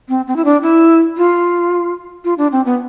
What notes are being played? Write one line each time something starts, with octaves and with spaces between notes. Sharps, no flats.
C4
C4
E4
D4
E4
F4
F4
D4
C4
B3